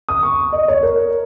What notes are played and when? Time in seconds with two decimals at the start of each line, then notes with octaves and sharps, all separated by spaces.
0.09 D#6
0.23 C#6
0.53 D#5
0.68 C#5
0.83 A#4